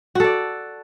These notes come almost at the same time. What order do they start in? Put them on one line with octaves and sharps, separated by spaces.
F#4 A4 D5